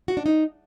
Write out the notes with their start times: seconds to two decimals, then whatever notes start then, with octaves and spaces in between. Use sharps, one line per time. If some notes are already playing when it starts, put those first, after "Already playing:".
0.08 F#4
0.17 D4
0.26 D#4